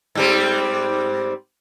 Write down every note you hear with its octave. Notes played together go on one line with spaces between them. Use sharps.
G#2 G3 C4